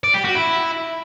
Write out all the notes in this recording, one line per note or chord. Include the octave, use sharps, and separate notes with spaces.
D5
G4
F#4
E4